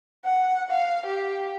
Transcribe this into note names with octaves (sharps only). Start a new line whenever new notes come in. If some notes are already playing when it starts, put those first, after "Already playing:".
F#5
F5
G4